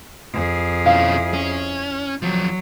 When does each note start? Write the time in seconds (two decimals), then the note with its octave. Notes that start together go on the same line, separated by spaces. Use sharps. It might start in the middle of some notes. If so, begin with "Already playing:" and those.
0.34 F2 G#4
0.85 B2 C#4 E4 F5
1.34 C#4
2.22 D#2 F3 F#3